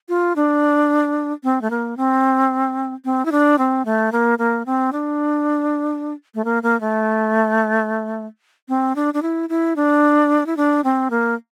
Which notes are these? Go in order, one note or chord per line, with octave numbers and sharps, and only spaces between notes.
F4
D4
C4
A3
A#3
C4
C4
E4
D4
C4
A3
A#3
A#3
C4
D4
A3
A#3
A#3
A3
C4
D4
D4
E4
E4
D4
E4
D4
C4
A#3